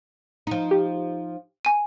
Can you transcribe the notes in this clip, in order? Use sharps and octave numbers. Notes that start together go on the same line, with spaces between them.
F3 D#4
G4
G#5 D#7